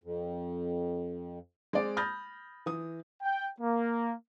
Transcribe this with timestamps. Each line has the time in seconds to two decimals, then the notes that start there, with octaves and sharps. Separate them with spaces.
0.04 F2
1.73 G#3 C4 D5
1.97 B5 D#6 F6 G6 A6 A#6
2.66 E3 D#6
3.22 G5
3.61 A#3